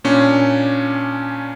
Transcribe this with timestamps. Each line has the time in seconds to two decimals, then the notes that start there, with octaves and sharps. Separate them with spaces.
0.04 A#2 C#4 D4